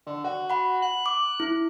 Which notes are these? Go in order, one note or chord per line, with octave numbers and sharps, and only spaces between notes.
D3
F#4
F#5 B5
F#6
D6
E4